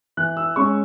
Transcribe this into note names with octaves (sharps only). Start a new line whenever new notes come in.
E3 F#6
E6
G#3 C#4 C#6